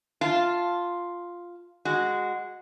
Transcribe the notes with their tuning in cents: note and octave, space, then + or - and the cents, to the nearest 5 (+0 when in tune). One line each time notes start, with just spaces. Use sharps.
F4 +0 A5 +0
G#3 -10 F#4 -10